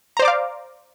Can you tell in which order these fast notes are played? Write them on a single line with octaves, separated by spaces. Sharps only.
A#5 C5 D5 D6 F5